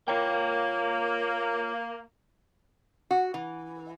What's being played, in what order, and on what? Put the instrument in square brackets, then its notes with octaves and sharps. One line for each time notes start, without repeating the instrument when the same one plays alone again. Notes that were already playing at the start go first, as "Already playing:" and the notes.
[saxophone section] A#3 [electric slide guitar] F4 C#5 G5
[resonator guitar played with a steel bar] F#4
E3